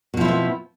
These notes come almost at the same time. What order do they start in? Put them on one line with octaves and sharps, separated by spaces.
B2 F3 E4 C4 B3